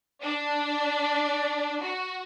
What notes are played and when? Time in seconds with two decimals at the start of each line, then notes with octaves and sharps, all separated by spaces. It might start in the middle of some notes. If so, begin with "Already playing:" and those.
0.23 D4
1.82 F#4